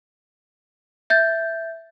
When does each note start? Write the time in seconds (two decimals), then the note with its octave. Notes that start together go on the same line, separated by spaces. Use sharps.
1.10 E5 G6 A6